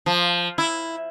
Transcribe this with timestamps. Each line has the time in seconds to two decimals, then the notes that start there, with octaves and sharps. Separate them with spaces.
0.06 F3
0.58 E4